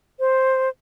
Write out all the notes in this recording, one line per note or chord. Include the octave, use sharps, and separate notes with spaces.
C5